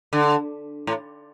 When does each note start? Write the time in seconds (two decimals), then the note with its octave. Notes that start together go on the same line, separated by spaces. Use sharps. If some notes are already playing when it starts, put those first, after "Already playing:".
0.13 D3
0.87 A2